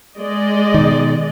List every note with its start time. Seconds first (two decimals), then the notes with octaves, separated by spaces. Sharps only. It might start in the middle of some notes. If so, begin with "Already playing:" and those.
0.17 G#3 D5 D#5
0.74 B2 D#3